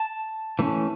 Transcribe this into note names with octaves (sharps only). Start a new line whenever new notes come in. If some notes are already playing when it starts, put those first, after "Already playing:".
Already playing: A5
E3 A3 C#4